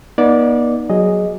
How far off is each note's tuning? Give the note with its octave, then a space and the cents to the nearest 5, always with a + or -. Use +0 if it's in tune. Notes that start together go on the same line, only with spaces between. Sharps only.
B3 -40 D#4 +0 D5 -5
F#3 +0 G#4 +0 D#5 +0